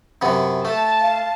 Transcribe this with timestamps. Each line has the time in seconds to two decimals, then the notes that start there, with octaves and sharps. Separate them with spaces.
0.21 F#2 C3 B3
0.65 A3 A5
1.01 F5